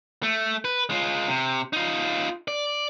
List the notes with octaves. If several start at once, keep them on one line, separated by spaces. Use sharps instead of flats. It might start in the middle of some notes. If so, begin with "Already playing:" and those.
A3
B4
G#3 F4
C3
D#4 F4
D5